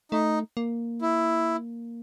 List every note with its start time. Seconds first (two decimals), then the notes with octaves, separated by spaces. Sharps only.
0.12 A3 D#4
0.57 A#3
1.02 E4